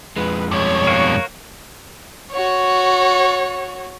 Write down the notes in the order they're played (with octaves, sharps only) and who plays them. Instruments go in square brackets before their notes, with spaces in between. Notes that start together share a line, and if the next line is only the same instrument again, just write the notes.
[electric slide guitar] F2 G#3 [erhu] B4
[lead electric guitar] G2 B2 [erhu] C#5
[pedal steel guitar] F#4 A#4 F5
[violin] F#4 C#5